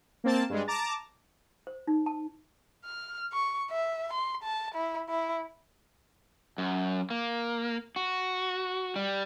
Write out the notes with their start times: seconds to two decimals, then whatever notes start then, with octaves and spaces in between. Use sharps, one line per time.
0.24 A#3 C4 A5
0.50 G2 G#3
0.67 A5 A#5 D6
1.67 C5
1.87 D#4
2.06 A5
2.85 F6
3.33 C#6
3.70 E5
4.13 C6
4.43 A5
4.75 E4
5.09 E4
6.58 F#2
7.10 A#3
7.96 F#4
8.96 G3